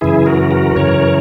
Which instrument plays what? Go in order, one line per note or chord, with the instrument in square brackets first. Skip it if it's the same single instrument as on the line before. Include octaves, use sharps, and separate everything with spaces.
[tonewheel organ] F#2 C#3 E3 E4 G#4
F#4 A#4
F#4 A#4
F#2 C#3 E3 A#4 C#5